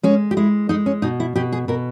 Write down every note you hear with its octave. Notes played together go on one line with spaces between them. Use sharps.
G#3 C#4
G4
G#3 E4
G#3 D#4
C#4
B2 D#4
E4
B2 G4
G#4
B2 A#4